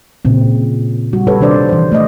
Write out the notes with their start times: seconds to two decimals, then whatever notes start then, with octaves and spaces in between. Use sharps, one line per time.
0.25 A#2 C#3 C4
1.13 G3 F#4
1.27 G4 A4 B4 C#5
1.40 C3 D#3 D4 C5 D5
1.69 E3 C5
1.92 A3 D5 D#5